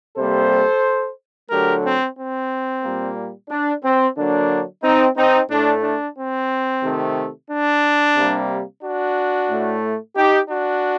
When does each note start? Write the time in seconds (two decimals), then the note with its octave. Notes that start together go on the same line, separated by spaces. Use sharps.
0.17 C3 G3 A#3 A4 C5
1.50 D3 F#3 A3 G4 A#4
1.84 C4
2.17 C4
2.83 A#2 G3 A#3
3.50 D4
3.83 C4
4.17 D3 F#3 A#3 D4
4.83 C4 D#4
5.17 C4 D#4
5.50 A2 A3 D4
5.83 D4
6.17 C4
6.83 C3 D#3 A3
7.50 D4
8.16 C3 G3 A#3
8.83 D4 F#4
9.49 A2 A3
10.16 D#4 G4
10.49 D4 F#4